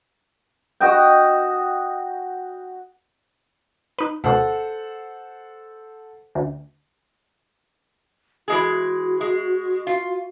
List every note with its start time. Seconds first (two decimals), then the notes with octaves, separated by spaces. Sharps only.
0.80 F#4 D#5 G5
3.99 D#4 B4
4.24 D2 B2 A4 C5 F#5
6.35 D2
8.48 E3 G#3 F#4 G#4
9.21 G#3
9.87 F4